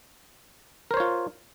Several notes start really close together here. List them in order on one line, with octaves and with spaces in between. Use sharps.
A#4 C5 C#5 F4